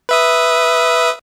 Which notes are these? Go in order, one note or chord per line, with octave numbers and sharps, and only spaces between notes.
B4 E5 D#6